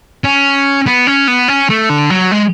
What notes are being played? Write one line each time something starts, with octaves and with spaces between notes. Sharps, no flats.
C#4
B3
C#4
B3
C#4
A3
D3
F#3
G#3